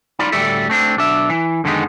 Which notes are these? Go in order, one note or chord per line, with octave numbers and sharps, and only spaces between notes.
D#4 F4 D5 B5
D2 A2 G3 A4 D5 E5
A3 C4 D4
B1 D4 E5
E3
F2 D3 D#3 G#3 B3 D#4